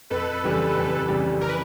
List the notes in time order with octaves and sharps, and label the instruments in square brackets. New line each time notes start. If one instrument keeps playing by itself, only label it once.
[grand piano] F2 [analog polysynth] A4 B4
[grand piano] C#3 E3 G3 C4
F2
C#3 E3 G3 C4
[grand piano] E3 [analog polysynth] A#4
[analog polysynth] B4